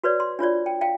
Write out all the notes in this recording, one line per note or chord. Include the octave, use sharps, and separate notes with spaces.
F#4 B4 C#5 D5
C6
D4 F4 C#5 D5
G5
F5 G5